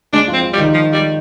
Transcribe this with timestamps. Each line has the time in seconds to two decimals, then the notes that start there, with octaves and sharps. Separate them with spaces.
0.13 G#3 D4 G#4
0.28 F3 F4
0.33 C4
0.43 F3 F4
0.53 G3
0.58 D#3 D#4
0.74 F3
0.93 G3